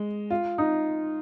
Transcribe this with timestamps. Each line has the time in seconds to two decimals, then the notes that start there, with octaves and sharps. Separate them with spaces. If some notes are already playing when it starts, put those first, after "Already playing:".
Already playing: G#3
0.30 F4
0.58 D#4